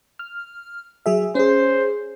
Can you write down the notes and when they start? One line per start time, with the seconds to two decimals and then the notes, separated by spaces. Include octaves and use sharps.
0.19 F6
1.06 F#3 G#4 E5
1.35 C#4 G#4 C5